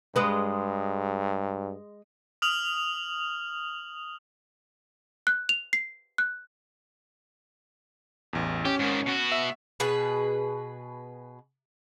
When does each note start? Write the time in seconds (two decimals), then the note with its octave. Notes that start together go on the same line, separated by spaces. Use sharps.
0.16 G2 G#3 B4
2.42 D#6 F6 F7 F#7
5.27 F#6
5.49 F7
5.73 C7
6.18 F#6
8.33 A1 E2
8.65 C#4 G4
8.79 G#2 D#3
9.06 B2 F#4
9.32 E5
9.80 B2 G#4 B4